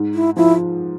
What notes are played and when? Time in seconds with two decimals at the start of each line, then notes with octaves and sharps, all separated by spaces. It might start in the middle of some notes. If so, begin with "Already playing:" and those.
Already playing: G#2
0.14 E4
0.37 F3 E4